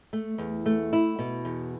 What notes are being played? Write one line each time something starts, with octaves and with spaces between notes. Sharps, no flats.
A3
E2
A3
E4
B2
E2